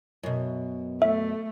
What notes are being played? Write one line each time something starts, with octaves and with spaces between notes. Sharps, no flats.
F#2 B2
A3 E5